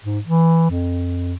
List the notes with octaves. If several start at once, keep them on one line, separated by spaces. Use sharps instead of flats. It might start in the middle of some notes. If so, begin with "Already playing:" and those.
G#2
E3
F2